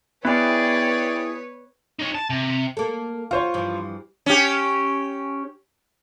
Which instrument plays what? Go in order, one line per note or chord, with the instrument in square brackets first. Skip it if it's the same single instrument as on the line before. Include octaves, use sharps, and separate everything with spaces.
[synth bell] B3 [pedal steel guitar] E4 G#4 [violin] B4 C#5 [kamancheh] D5 G5
[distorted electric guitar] D#4 C#5
A5
C3
[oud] A#3 A4
[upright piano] F4 C5 C#5 [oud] F#4
[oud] G2 E3 F3
[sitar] C#4 G4